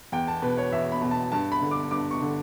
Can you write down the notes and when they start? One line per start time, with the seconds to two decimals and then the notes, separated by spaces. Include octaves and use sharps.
0.12 E2 G5
0.28 A5
0.42 B2 B4
0.57 C#5
0.72 E2 E5
0.92 B5
1.02 B2
1.11 A5
1.32 G2 A5
1.52 B5
1.61 D3
1.71 D6
1.91 G2 D6
2.11 C#6
2.22 D3